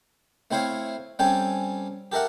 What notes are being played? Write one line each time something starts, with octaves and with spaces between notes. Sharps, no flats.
A3 C4 E4 C5 C#5 F5
G3 C4 C#4 A4 G5 G#5
G4 A4 A#4 E5 F#5